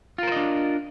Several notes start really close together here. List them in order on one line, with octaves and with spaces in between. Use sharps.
F4 A#4 C5 D#5 D4